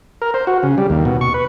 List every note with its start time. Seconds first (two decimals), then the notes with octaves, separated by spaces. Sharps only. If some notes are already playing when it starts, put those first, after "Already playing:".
0.22 A#4
0.34 C5
0.47 F#4
0.63 C#3
0.78 G3
0.90 D#2
1.05 B2
1.21 C#6
1.34 B4